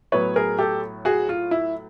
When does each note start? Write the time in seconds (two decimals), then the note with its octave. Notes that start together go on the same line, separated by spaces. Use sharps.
0.12 A2 F#3 B3 B4 C#5
0.36 G#4 A#4
0.59 G4 A4
1.05 F#4 G#4
1.29 F4
1.51 E4